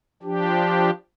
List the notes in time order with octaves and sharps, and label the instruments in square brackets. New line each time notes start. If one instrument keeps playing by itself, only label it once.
[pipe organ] F3 D4 G4